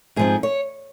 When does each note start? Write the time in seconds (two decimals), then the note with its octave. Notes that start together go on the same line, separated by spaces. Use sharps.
0.16 G#2 F3 C4 G#4
0.43 C#5